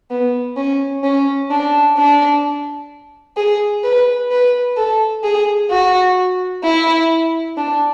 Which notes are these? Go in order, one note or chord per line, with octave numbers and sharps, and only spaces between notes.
B3
C#4
C#4
D4
D4
G#4
B4
B4
A4
G#4
F#4
E4
D4